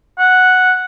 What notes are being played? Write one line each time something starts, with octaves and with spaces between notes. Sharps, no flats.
F#5